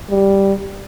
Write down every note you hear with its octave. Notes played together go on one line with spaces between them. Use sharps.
G3